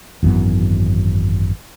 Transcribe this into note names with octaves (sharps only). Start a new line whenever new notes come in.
G#1 F#2 E3 B3